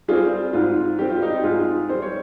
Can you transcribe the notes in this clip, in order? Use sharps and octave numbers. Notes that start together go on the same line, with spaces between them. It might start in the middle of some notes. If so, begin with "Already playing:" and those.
G3 C4 F4 G#4
G#2 F4
G3 C4 G4
F4
D#4 G4
G#2 F4 G#4
G3 C4 C5
C#5